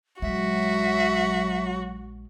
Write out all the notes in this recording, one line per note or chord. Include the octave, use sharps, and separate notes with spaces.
A#1 F#3 G#3 F#4 E5